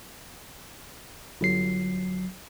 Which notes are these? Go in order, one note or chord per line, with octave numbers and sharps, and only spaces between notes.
G1 F#3 C7